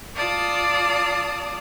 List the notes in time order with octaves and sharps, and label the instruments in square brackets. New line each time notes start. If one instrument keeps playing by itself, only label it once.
[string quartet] F4 D5 A5 D#6